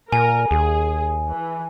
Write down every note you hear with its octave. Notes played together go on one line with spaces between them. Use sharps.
A#2 A#4 G#5
D#2 G#4
E3